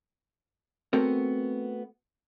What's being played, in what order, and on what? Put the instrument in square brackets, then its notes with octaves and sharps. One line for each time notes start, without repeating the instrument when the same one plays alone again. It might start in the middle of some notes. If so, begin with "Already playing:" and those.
[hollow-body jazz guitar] A3 B3 C4 F#4 A4 A#4